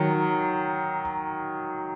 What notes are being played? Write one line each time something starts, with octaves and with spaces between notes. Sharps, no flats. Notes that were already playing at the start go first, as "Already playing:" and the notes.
Already playing: D#3 F#3